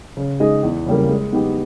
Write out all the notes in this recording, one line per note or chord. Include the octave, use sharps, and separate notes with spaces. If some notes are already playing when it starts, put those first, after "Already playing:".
C#3
G#3 D#4 G#4 D#5
E2
C#3 G3 A#3
G#3
B3 D#4 G4